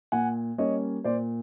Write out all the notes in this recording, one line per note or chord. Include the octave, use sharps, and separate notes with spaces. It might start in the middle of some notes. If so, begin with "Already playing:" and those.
A#2 F#5 G#5
G3 A#3 C#4 C#5 D#5
A#2 C5 D5